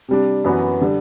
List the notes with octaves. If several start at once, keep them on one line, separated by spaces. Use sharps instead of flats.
C3 G3 D4
F#2 E3 B3 F#4
D3 G3